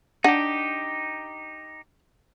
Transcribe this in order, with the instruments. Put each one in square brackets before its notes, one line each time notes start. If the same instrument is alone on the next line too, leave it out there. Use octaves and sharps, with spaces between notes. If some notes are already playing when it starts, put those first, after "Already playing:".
[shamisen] D4 F#5 [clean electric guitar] D#4 G4